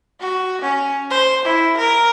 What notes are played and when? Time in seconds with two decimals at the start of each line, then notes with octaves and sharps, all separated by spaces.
0.20 F#4
0.62 C#4
1.11 C5
1.45 E4
1.77 A#4